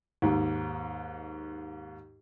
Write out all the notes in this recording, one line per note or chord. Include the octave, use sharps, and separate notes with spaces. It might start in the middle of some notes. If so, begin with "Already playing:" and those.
D#2 G#2